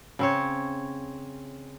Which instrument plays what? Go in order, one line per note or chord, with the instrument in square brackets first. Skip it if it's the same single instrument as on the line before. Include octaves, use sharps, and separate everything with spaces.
[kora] C#3 C4 C#5